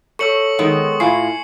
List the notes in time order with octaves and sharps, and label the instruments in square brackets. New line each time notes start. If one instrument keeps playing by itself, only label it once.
[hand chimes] A4 C#5 E6 [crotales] C#6 C#7 F#7
[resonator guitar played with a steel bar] D#3 G#3 B3
[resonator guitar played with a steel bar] A2 E4 F4 [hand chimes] G#5 [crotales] C7